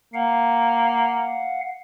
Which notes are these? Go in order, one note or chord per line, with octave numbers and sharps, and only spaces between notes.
A#3 F5 F#5